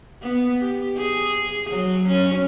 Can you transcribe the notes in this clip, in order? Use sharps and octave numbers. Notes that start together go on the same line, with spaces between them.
B3
G4
G#4
F#3
C#4